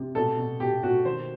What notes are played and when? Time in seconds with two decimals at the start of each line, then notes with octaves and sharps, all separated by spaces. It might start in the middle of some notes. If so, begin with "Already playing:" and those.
Already playing: C3
0.15 B2 A4
0.38 B2
0.60 B2 G4
0.83 B2 F#4
1.05 D#3 C5